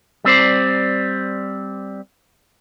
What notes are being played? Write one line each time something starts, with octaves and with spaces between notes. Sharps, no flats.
G3 C4 C5 D5